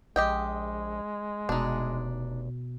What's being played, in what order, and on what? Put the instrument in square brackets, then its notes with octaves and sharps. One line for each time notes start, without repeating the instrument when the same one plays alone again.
[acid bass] A#1 [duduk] G#3 [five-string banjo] G4 D#5 G5
[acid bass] F1 [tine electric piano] B2 [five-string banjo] D4 D#4